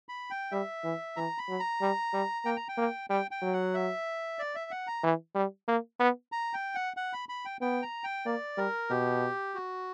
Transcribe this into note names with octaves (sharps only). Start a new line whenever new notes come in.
B5
G5
G3 E5
E3
E3 A#5
B5
F#3
A#5
G3
G3
A#3 G5
A#5
G5
A#3
G3 G5
G5
F#3
F#5
E5
D5
E5
F#5
A#5
E3
G3
A#3
B3
A#5
G5
F#5
F#5
B5
B5
G5
B3 G5
A#5
G5
A#3 D5
G3 A#4
B2 G4
F#4